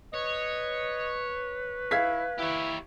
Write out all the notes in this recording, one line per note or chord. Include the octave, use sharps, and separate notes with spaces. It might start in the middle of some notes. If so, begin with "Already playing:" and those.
B4 C#5 D#5
E4 F5 G#6 B6
E4 G4 C#5